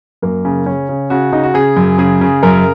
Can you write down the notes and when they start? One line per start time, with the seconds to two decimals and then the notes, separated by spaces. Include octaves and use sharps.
0.22 F#2 A#3
0.45 C#3
0.66 C#3 C#4
0.89 C#3
1.10 C#3 F#4
1.32 C#3 D#4
1.43 F#4
1.54 C#3 G#4
1.76 F#2
1.98 C#3 G#4
2.21 C#3
2.43 F#2 A#4